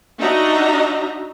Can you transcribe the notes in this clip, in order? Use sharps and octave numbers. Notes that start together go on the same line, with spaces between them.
D4 D#4 F#4 D#5 E5 A#5